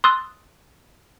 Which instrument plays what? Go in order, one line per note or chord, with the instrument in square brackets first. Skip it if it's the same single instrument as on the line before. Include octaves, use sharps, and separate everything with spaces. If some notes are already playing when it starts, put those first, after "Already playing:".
[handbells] C6 D#6 E6 F#6 A6